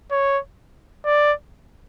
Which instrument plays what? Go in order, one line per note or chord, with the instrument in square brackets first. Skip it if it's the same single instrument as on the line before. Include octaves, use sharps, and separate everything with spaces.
[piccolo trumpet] C#5
D5